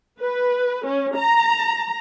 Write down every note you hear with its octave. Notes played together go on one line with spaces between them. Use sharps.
B4
C#4
A#5